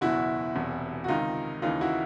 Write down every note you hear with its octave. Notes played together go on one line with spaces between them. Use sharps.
F#1 E2 B2 E4 F#4
E1 E2 C3
F#4
C#2 C3 D#3 D#4 F4
D#2 C#3 E3 D#4 F4
E4 F#4